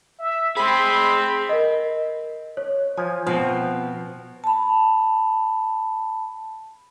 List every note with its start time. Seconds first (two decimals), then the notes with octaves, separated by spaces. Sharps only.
0.19 E5
0.56 C4 G#4 B5 C6
1.49 A#4 D#5
2.57 C#5
2.97 F3 G#5
3.27 B2 F3 C4
4.44 A5 B5